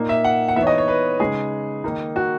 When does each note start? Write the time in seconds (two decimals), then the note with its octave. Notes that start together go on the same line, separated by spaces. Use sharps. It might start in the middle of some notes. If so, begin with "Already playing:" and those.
Already playing: A#2 A#3 D#4
0.09 E5
0.24 F#5
0.48 F#5
0.56 E3 B3 D#4 E5
0.62 C#5
0.67 D#5
0.78 C#5
0.88 B4
1.20 C#3 G#3 D#4 G#4
1.84 D#3 A#3 D#4
2.16 F#4